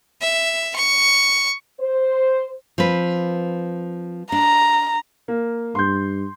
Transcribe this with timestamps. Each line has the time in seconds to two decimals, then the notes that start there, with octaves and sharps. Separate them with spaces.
0.21 E5
0.76 C#6
1.80 C5
2.78 F3 C4 B4
4.32 D4 A#5
5.28 A#3
5.75 G2 C6 G6